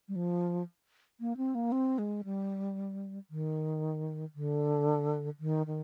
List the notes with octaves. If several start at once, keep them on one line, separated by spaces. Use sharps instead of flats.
G3
F3
A#3
C4
A#3
C4
G#3
G3
D#3
D3
D#3
D#3